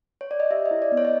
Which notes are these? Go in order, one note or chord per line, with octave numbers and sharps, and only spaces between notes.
C#5
D5
D#5
G4 E5
D#5
E4
D5
B3
C#5
D#5